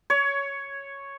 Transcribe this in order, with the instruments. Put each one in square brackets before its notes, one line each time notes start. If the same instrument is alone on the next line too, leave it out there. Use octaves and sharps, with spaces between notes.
[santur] C#5